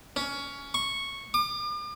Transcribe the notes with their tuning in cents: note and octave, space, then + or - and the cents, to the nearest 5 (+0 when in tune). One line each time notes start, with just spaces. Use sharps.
C#4 +15
C#6 -5
D6 +40